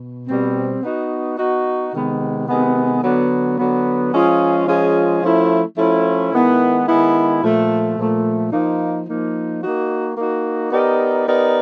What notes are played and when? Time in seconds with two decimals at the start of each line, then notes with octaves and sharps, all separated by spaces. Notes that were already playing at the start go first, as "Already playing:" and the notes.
Already playing: B2
0.27 B2 G3 C4
0.82 B3 D#4 F#4
1.37 B3 D#4 F#4
1.92 C3 D#3 G#3 B3
2.47 C3 D#3 G#3 B3
3.02 D3 F#3 B3
3.57 D3 F#3 B3
4.12 F3 G#3 C#4 F4 G#4
4.67 F3 G#3 C#4 F4 G#4
5.22 F3 A3 C#4 E4
5.77 F3 A3 C#4 E4
6.31 D#3 G#3 B3 E4
6.87 D#3 G#3 B3 E4
7.41 A#2 F3 A3
7.96 A#2 F3 A3
8.51 F3 A#3 D#4
9.07 F3 A#3 D#4
9.61 A#3 D#4 F#4
10.17 A#3 D#4 F#4
10.72 B3 D#4 G4 A#4 D5
11.26 B3 D#4 G4 A#4 D5